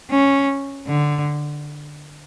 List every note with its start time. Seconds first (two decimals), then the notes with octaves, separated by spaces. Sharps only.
0.10 C#4
0.87 D3